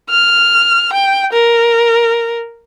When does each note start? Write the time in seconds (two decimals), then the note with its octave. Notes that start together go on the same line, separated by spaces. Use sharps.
0.10 F6
0.93 G5
1.33 A#4